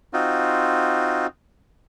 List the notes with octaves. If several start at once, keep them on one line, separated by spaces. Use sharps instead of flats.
C4 D#4 F4 F#4